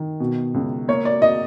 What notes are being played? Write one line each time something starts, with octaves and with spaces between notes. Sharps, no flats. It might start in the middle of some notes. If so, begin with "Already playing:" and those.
Already playing: D#3
B2
C#2
A#3 C#5
D5
D#5